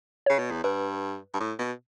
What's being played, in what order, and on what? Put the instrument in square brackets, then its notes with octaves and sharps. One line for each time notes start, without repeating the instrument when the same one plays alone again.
[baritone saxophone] C#3 [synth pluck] C#5
[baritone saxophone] B2
E2
[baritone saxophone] G2 [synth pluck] B4
[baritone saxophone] G2
A2
B2